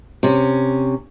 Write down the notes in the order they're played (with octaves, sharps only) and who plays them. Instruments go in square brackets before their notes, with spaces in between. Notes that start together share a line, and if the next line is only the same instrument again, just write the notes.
[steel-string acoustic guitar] C3 C#4